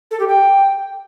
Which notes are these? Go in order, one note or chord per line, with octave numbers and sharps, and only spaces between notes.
A4
G4
G5